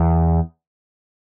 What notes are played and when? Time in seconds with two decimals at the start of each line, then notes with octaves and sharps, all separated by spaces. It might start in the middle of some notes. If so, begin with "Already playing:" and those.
Already playing: E2